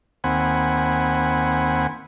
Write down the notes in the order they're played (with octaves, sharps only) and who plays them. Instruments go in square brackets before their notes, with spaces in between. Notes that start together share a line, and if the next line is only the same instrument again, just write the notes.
[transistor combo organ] D#2 C4 F#5 G#5 B5